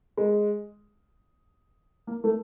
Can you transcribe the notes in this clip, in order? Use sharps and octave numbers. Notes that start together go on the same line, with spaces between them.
G#3
A#3
A3